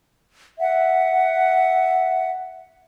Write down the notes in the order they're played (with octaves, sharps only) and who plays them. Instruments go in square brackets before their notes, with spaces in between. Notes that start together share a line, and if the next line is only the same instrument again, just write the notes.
[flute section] E5 F#5